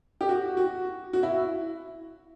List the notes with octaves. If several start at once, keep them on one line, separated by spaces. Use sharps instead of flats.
G4
F#4
F#4
F#4
E4